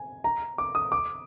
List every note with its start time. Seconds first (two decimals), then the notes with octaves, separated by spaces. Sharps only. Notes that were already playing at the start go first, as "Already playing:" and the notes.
Already playing: G#5
0.24 A#5
0.58 D6
0.75 D#6
0.92 D6